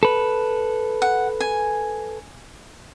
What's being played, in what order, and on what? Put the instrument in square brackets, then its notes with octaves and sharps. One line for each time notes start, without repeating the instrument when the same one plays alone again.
[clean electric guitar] A4 B4
[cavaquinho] F#5
G#5